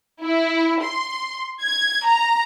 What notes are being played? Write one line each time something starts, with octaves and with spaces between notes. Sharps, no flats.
E4
C6
G#6
A#5